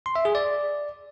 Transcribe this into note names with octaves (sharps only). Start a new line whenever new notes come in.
C6
E5
G#4
D5